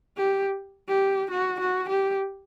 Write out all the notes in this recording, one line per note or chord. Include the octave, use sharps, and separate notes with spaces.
G4
G4
F#4
F#4
G4